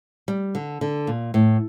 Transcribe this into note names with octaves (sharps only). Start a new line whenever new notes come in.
G3
D3
D3
A#2
A2